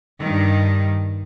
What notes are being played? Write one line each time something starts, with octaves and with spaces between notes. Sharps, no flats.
G2 D#3